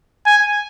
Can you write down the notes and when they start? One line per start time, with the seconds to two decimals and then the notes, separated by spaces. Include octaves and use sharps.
0.26 G#5